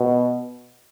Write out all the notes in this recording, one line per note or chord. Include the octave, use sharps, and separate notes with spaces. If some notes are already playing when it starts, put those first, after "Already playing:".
Already playing: B2